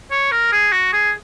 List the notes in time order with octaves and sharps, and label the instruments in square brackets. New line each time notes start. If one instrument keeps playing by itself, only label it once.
[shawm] C#5
A#4
G#4
F#4
G#4